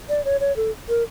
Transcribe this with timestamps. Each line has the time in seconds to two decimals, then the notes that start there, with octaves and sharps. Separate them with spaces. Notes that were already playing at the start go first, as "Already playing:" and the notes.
0.09 D5
0.25 C#5
0.40 C#5
0.56 A4
0.89 A#4